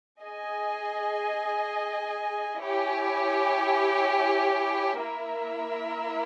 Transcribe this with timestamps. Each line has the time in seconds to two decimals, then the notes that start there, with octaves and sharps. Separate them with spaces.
0.21 G#4 D#5 G#5
2.61 E4 G4 C#5 G#5
5.02 A#3 E4 A#4 E5